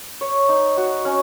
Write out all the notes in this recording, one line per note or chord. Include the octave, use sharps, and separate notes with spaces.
C#5
D#4
F#4
C#4